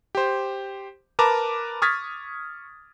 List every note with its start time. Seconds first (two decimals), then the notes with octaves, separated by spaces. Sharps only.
0.15 G4 C5
1.19 A#4 B4 A5 A#5 D6
1.82 C#6 D#6 F6 G#6 A6 B6